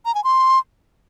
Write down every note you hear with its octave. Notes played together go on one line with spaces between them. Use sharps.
A#5
G#5
C6